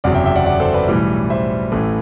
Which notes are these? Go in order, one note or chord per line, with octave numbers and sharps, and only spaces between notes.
F#1 E2 C3 F#3 D5 F#5
E5 G5
E5 G5
D5 F#5
D5 F#5
A4 C5
B4 D5
B1 A2 E3 G3
C5 E5
A1 A2 E3 A3